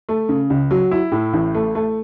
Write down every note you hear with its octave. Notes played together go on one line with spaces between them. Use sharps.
A3
C#3
C#2
F#3
E4
A2
A1
A3
A3